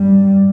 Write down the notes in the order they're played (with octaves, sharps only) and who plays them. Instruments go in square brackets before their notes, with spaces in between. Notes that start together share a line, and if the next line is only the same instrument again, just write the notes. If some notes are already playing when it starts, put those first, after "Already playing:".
Already playing: [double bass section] G2 G3